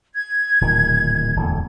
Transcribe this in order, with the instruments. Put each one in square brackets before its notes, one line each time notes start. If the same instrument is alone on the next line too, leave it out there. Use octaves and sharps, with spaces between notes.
[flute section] G#6
[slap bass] D1 A#2 D#3
D1 E2 D3